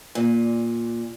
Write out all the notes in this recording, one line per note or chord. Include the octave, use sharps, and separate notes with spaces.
A#2